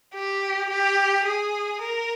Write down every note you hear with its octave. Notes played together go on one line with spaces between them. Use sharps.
G4
G4
G#4
A#4